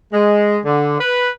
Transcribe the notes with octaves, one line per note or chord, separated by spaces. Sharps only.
G#3
D3
B4